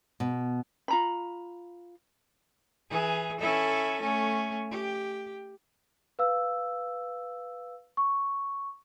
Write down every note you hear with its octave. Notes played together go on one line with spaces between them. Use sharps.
B2
F4 A#5 B5
E3 G#4
C#4 E4 A4
A3 C#4
G4
B4 F5 E6
C#6